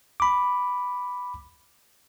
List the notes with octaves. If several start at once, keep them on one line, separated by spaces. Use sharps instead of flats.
B5 D6